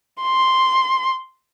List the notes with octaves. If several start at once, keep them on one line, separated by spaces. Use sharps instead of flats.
C6